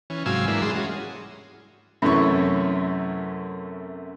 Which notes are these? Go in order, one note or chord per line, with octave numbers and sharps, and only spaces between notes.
E3 C#4
G#2 C3 F#3 F5 G#5 E6
G#2 E3 A#3 D4 E4
G3 G#3 D4 G#4 C6
G#3 C#4 F#4
F#2 C3 E3 A3 C#4 C#6